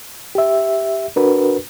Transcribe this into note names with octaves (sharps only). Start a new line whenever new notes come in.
G4 E5
D4 F#4 A#4 B4